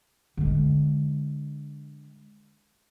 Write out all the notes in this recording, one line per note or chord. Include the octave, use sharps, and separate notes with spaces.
D3 G#3